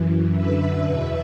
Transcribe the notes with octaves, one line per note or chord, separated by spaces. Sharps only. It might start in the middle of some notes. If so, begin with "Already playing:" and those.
Already playing: F#2 E3
F#2 D3 B4 E5
E2 B2